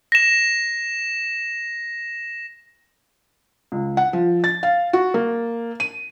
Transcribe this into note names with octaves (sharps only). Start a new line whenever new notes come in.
A#6 E7
C#2
F#5
F3
A6
F5
F#4
A#3
D#7